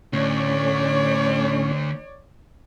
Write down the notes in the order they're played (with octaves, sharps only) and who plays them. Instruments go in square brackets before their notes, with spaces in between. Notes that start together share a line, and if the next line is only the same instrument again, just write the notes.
[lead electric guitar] D2 [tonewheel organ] A2 C#4 [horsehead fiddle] C#5 D5